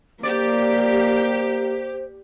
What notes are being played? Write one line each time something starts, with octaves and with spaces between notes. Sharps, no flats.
A#3 G4 C5 D5